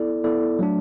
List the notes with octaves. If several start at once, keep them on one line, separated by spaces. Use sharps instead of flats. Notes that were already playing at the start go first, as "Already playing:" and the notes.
Already playing: B3 E4 A4 D5
B3 E4 A4 D5
F#3 A3 D4